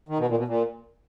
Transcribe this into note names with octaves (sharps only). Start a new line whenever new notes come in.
D#3
B2
A#2
B2
A#2